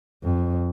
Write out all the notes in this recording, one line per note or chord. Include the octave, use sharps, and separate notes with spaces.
F2